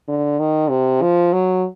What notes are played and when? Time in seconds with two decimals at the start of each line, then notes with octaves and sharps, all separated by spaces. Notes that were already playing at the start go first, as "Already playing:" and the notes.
0.08 D3
0.39 D#3
0.70 C3
1.02 F3
1.33 F#3